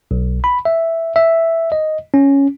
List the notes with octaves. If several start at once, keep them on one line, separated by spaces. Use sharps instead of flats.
B1
B5
E5
E5
D#5
C#4